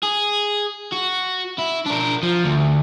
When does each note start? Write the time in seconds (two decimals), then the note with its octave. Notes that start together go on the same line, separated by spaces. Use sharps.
0.03 G#4
0.92 F#4
1.58 E4
1.86 D4 A#4
2.23 F3
2.45 D2